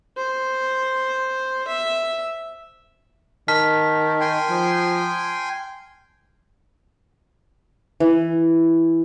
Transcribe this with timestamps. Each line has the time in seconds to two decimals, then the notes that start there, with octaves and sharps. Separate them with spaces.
0.17 C5
1.67 E5
3.48 D#3 A5 F6 B6
4.20 G5 G#5 C6
4.50 F3
8.00 E3